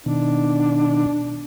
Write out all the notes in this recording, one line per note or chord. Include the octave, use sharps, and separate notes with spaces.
B2 D#3 D4